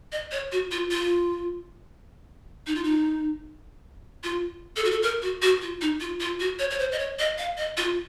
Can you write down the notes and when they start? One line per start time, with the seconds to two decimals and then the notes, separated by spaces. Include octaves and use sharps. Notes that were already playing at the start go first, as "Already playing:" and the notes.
0.12 D#5
0.31 C#5
0.52 F#4
0.71 F4
0.91 F4
2.67 D#4
2.75 F4
2.84 D#4
4.24 F4
4.76 A4
4.84 F#4
4.91 A4
5.02 A#4
5.22 F#4
5.42 F#4
5.61 F4
5.81 D#4
6.00 F4
6.20 F4
6.40 F#4
6.59 C#5
6.70 C#5
6.79 C5
6.92 D#5
6.99 C#5
7.19 D#5
7.38 F5
7.57 D#5
7.77 F4